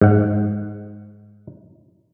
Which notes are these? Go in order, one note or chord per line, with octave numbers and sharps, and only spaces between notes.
G#2 F#5